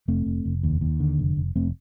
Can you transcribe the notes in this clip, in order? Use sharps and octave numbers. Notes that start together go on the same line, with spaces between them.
F1 A3 C4
F1
F1
D#2
D#2
D3
F1
F1
F1 A3 C4